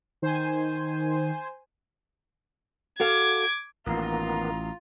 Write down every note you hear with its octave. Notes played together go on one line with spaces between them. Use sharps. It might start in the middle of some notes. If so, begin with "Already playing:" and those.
D#3 C5 G#5
F#4 A4 F5 D6 G#6
A1 D#3 A#3 B3 F4 A#5